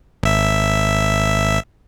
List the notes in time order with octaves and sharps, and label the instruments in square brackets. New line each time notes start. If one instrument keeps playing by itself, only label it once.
[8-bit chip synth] G#1 E5